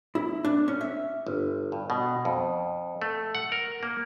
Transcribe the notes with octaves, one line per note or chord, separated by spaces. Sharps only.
E4
D4
C#4
E5
G1
G2
B2
F2
A3
F#5
A#4
A#3